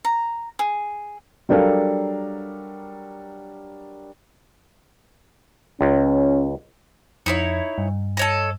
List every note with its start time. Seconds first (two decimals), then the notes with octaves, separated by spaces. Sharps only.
0.05 A#5
0.59 G#4
1.49 F#3 G3 D4 A4 A#4 F5
5.81 C#2 C#4
7.26 F2 D#4 E4 C#5
7.78 G2
8.17 A4 C#5 D#5